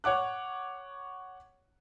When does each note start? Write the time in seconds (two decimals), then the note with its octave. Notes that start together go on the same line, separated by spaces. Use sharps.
0.04 C#5 F#5 D6 F#6